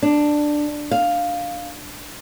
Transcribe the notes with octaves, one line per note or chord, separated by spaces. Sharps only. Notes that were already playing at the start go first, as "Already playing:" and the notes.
D4
F5